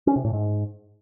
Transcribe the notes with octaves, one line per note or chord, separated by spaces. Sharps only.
C#4
C3
A2
G#2